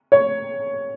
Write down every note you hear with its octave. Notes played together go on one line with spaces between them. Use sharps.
C#5